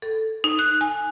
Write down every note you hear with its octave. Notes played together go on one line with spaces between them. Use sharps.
A4
D#4
F#6
G#5